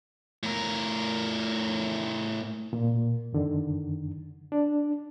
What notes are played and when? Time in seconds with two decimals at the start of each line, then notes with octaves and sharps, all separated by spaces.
0.43 A2 A#4
2.73 A#2 A#3
3.32 F#2 D3 D#3
4.52 D4